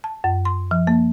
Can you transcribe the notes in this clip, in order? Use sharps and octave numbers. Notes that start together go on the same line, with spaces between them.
A5
F#2
C6
F3
A#3